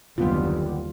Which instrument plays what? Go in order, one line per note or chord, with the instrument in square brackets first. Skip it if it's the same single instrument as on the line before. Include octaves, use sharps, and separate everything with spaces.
[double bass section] F#1 D#2 [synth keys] D3 B3 G4 [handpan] G3 F4